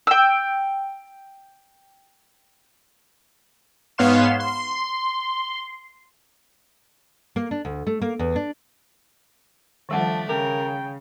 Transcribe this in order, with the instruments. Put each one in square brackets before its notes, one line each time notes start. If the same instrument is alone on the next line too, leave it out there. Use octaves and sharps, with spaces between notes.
[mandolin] G5 E6
[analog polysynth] G#2 B3 C#5 F5 C6 E7
C6
[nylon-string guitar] A#3
D4
D2
A3
A#3
E2
D4
[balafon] D#3 G3 F#5 [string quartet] F3 A3 D4
[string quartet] C#3 [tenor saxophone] A#4 [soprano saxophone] G5 [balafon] D6